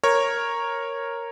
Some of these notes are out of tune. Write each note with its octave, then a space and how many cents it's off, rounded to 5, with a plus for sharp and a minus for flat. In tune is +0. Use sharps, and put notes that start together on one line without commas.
A#4 +0 C#5 -10